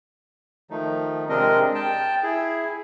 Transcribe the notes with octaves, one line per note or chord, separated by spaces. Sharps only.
D#3 F3 A3 D#4
C3 G#3 C4 D4 A#4 D#5
G5 A5
E4 G#4